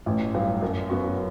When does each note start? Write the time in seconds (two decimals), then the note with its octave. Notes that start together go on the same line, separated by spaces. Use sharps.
0.06 A1
0.34 G2 F#3
0.62 F#2
0.90 F#3 B3 F#4